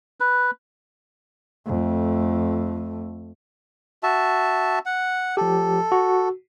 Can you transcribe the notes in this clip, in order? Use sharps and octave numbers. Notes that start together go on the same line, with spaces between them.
B4
F2 A3
F#4 E5 A5
F#5
F3 G4 A4
F#4